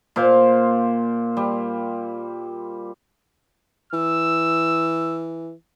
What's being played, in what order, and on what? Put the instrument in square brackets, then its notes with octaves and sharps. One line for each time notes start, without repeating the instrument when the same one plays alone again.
[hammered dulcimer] A#2 F4 C5 F5
G3
[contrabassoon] E3 [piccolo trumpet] E6